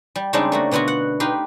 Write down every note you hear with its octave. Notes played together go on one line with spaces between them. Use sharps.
G3
C#3 G3 G#3 C4 D4 D#4
A3 A#3 F#4
B2 D3 B3 F4 F#4
F#5
D#4 G4 B4 F5 C6